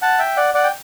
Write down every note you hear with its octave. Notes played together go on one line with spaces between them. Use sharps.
F#5 A5
E5 G5
D5 F#5
D5 F#5
G5